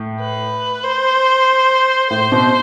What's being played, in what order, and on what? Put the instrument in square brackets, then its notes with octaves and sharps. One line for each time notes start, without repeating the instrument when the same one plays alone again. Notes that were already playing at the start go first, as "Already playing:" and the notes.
Already playing: [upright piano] A2
[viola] B4
C5
[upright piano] A2 [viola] C5
[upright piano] B2